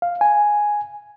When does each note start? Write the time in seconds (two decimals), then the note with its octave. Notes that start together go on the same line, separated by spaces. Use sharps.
0.02 F5
0.21 G#5